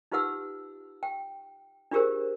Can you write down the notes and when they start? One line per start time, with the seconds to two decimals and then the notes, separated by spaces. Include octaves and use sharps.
0.12 D#4 F4 G4 B4 F#5 E6
1.03 G5
1.91 D4 F4 G4 G#4 A#4 C5